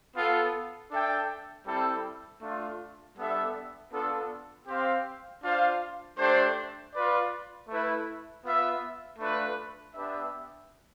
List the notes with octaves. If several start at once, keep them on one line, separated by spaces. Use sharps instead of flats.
B3 F4 A4
D4 A4 E5 G5
G3 C4 E4 A4
A3 D4 F4
G3 B3 D4 A4 E5
B3 D4 F4 A4
C4 G4 C5 F5
D4 F4 C5 F5
A3 D4 G4 C5
F4 B4 D5
A3 E4 B4
B3 F4 B4 E5
A3 D4 F4 B4
B3 D4 G4 B4 E5